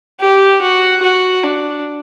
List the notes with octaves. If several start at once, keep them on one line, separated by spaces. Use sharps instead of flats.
G4
F#4
F#4
D4